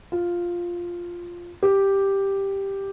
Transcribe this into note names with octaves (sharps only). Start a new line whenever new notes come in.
F4
G4